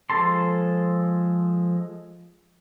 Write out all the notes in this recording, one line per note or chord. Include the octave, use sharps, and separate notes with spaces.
F3 G#3 A4 A5 C6